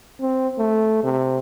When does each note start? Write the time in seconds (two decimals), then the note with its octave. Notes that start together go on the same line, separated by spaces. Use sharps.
0.20 C4
0.58 A3
1.03 C3